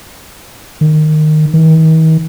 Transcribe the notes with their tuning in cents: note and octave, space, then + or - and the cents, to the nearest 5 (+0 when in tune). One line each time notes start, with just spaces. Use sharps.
D#3 -15
D#3 +45